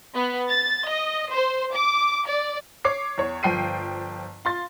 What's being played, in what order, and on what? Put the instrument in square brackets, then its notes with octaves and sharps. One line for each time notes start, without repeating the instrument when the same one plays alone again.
[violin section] B3
A6
D#5
C5
D6
D5
[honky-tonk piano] C#5 D6 C7
E2 C#5
G1 F3 G5 C7 D#7
F4 C6 A6